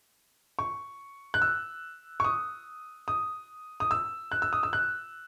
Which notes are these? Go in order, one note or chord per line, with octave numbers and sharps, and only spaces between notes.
C#6
F#6
E6
C#6
D#6
D#6
D#6
E6
F#6
E6
D#6
E6
F#6